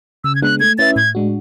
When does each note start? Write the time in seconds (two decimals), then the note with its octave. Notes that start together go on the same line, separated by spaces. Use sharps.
0.24 C#3 E6
0.35 G#6
0.42 G#3 B3 D4 F#6
0.60 A3 G#6
0.78 C#4 E4 B4 E5 A6
0.96 A2 G#6
1.15 G#3 D4 F#4